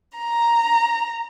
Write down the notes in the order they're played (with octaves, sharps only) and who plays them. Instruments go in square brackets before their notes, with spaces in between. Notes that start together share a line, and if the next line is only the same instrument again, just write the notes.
[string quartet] A#5